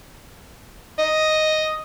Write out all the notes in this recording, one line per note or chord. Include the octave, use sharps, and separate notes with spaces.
D#5